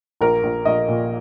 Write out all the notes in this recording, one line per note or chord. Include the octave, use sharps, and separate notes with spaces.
A#1 A#4
A#1
A#1 D#5
A#2